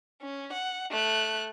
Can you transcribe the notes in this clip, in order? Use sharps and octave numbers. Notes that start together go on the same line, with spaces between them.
C#4
F#5
A3 F#6